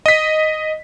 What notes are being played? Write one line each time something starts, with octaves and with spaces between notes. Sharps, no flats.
D#5 B6